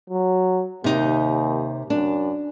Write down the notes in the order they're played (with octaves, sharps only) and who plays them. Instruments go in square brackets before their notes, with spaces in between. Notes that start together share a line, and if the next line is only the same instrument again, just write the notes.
[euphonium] F#3
[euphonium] D#2 [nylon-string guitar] C3 D#4
[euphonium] F#2 [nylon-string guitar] D4